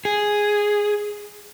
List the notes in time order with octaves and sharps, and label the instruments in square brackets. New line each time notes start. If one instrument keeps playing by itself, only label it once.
[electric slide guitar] G#4